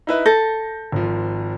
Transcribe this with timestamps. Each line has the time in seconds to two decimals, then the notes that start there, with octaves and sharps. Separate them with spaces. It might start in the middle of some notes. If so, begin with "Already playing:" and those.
0.07 D#4 E4 B4
0.26 A4 G6 A#6
0.92 G#1 F3